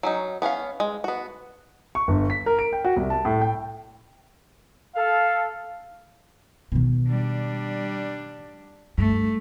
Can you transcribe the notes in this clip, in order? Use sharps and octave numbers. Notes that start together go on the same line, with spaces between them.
F#3 C#4 D#4
B3 C#4 B4 F5
G#3
B3 F#4
C#6
G1
B6
A#4
D7
G5
F#4
C2
A5
A2
G5
A4 F5
B2 D#3
G3 D4
G2 A3